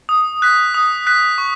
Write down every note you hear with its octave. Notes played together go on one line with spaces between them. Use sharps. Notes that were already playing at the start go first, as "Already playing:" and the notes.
D#6
F#6 B6
D#6
F#6 B6
C#6